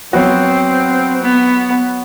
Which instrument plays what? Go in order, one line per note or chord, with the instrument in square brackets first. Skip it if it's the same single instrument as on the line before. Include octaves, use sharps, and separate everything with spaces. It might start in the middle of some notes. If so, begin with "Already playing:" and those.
[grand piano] F#3 B3 F#4 [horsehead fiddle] C4
[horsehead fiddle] B3